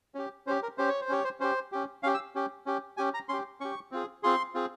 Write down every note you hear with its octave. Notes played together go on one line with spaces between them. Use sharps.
C#4 G4
C#4 G4 C5
A#4
C#4 G4 C5
C#5
C5
C#4 G4 C#5
C5
C#4 G4 C5
C#4 G4
C#4 G4 F5
E6
C#4 G4
C#4 G4
C#4 G4 G#5
A#5
C#4 G4 C6
C#4 G4 C#6
C4 F4 G#4
C4 F4 G#4 C6
C4 F4 G#4